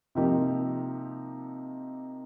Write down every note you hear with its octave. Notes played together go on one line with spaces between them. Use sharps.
C3 F3 A#3 D#4 G4